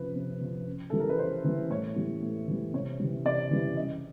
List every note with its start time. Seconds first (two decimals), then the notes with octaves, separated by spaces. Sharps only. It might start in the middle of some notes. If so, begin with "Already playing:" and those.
Already playing: C3 F3 B4
0.15 C3
0.41 F3
0.67 C#3
0.90 E3 G3 A4
1.00 A#4
1.09 B4
1.18 C#3 C5
1.44 E3 G3
1.70 A2 C#5
1.96 E3 G3
2.22 A2
2.48 E3 G3
2.73 C3 C#5
3.00 E3 G3
3.25 C3 D5
3.51 E3 G3
3.77 C#3 D#5